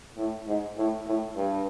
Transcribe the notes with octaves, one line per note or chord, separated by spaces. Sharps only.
A2
G#2
A2
A2
G2